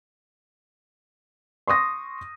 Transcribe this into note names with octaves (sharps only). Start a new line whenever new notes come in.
C6 C#6 D#6 A#6